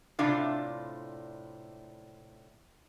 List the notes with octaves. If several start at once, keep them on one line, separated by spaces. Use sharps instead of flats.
A2 C3 D4 F4